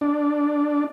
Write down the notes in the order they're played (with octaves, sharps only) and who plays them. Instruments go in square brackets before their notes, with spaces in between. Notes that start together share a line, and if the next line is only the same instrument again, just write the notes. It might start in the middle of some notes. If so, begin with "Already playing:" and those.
[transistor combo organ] D4